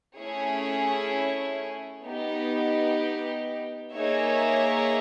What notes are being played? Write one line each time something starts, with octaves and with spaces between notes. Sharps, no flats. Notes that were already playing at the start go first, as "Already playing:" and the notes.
A3 C#4 E4 G#4 C#5
B3 D#4 G4
A#3 D#4 G#4 C#5 E5